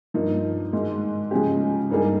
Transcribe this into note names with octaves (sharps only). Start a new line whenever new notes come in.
G2 F3 A#3 D#4
G#2 D#3 G#3
C#3 F3 G#3 C#4 G4
G2 G3 A#3 D#4 G#4